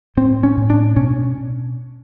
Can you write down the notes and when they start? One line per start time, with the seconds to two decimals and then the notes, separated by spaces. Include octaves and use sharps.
0.17 A2 C4
0.43 C#4
0.57 A2
0.70 D4
0.96 B2 C#4